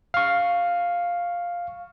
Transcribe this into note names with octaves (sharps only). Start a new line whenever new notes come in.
F5 C#6